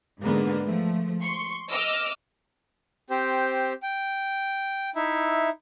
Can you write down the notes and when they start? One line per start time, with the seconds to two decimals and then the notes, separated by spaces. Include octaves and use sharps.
0.22 G#2 D3 G#3 A#3 B3
0.65 F3 A3
1.23 C6 C#6
1.70 D#5 D6 E6 F6
3.10 C4 G4 C5
3.83 G5
4.95 D#4 E4 E5